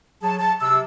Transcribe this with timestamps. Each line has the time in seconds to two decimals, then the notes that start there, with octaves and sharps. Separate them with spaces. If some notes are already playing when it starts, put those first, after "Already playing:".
0.22 F#3 G#4 A5
0.39 A5
0.61 C3 E6